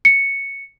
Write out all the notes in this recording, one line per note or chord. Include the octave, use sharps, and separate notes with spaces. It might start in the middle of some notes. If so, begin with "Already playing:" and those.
C#7